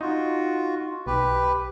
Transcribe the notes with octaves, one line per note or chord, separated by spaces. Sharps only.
D#4 F4 F#4
B1 G4 B4